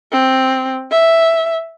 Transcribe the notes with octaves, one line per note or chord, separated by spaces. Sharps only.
C4
E5